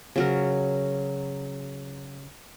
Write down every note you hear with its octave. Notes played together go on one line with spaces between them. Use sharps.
C#3 F#3 A#4